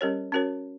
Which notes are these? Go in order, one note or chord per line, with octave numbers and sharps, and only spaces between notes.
G3 C#4 G4 A#4 C#5
C#4 F#4 A#4 C#5